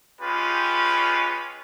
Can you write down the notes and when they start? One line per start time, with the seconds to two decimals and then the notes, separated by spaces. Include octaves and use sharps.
0.21 G#3 C#4 F4 G4 B4